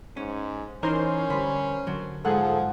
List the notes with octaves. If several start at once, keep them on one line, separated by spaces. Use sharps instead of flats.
G#2 C#4
E3 C#4 D#4 A#4 C5 C#5 C6
D3 G3 B5
D3 F#3
G#2 F3 G#4 A4 F#5